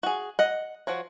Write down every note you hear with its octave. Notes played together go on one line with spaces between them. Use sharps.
F#4 G#4
D#5 F#5
F3 F#4 C#5